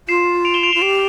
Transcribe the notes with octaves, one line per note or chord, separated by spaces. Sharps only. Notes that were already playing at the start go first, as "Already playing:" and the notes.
F4 C7 E7
D7 F7
E7 G7
D7 F7
F4 E7 G7
G4 D7 F7